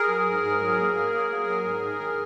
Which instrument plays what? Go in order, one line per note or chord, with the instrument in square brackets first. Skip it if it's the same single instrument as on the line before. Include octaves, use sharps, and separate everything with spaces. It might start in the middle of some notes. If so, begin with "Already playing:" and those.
Already playing: [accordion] G#4 A#4
F#3
G#2
G#2
F#3
A#3
A#3
A#3
F#3
F#3
G#2
D#3
D#3